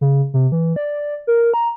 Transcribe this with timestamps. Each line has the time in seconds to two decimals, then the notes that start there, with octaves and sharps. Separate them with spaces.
0.01 C#3
0.34 C3
0.52 E3
0.76 D5
1.27 A#4
1.54 A#5